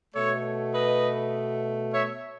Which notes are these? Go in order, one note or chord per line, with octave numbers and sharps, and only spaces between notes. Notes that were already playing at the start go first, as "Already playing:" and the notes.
B2 A3 A4 C#5
B4 D#5
C#5 E5